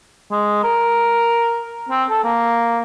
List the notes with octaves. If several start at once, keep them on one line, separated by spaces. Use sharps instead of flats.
G#3
A#4
C4
A4
A#3